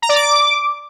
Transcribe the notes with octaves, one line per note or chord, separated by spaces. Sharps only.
A#5
D5
D6